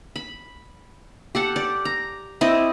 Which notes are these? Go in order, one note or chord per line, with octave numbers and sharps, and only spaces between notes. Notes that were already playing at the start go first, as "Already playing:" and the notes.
B5
G4 A4 F#5
D5
A#5
C4 E4 D5 D#5